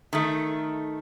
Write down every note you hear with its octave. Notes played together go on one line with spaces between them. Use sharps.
D#3 A3